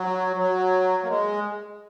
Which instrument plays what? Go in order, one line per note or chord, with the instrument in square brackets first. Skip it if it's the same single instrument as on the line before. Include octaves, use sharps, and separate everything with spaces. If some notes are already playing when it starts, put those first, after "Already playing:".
Already playing: [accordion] F#3
F#3
A#3
G#3